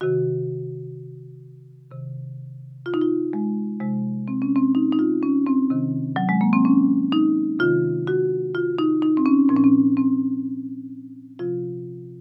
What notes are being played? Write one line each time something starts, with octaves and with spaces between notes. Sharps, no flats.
C3 D#3 F#4
C3 D#3
F4
D#4
F4
G#3
C3 F3 G#3
C4
C#4
C4
D#4
D#4
F4
C#4
C4
C3 D#3
F#3
G#3
A#3
C4
C#4
D#4
C3 D#3 F4
F#4
F4
D#4
D#4
C4
C#4
A#2 F3 C4
C#4
C4
C4
C3 F3 F4